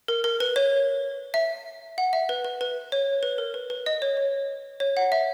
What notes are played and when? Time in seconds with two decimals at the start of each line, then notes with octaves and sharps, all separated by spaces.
0.08 A#4
0.24 A#4
0.40 B4
0.56 C#5
1.34 E5
1.98 F#5
2.13 E5
2.29 B4
2.44 B4
2.61 B4
2.92 C#5
3.23 B4
3.38 A#4
3.54 B4
3.70 B4
3.86 D#5
4.02 C#5
4.17 C#5
4.80 C#5
4.97 F#5
5.12 E5